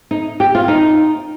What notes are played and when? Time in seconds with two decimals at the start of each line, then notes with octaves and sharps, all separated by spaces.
0.11 D#4
0.40 G4
0.55 F4
0.68 D#4